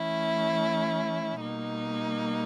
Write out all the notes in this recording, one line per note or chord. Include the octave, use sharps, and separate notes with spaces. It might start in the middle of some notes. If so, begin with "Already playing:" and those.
Already playing: E3 A3 C#4 E4
B2 G3 A#3 D#4